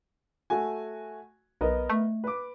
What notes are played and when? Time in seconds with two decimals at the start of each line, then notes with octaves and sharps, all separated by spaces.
0.50 A3 F#4 G#5
1.61 B1 B3 A#4 D#5
1.90 A3
2.24 B4 D6